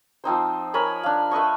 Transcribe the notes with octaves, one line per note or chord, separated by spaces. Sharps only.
F3 C4 D#4 C5
A#4 C#5 G#5 B5
D4 F5
A3 B4 D#5 C#6